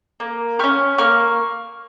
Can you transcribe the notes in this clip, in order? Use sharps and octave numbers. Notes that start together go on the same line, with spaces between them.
A#3
C#4 G4 C#6 F6
A#3 C#6 F6